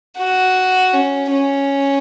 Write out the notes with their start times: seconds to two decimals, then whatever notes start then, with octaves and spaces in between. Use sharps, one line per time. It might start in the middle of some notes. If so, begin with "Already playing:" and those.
0.17 F#4
0.93 C#4
1.31 C#4